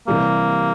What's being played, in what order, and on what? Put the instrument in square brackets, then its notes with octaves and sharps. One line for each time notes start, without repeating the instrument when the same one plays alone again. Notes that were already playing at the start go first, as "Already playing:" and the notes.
[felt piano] C3 E3 G3 [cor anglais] A#3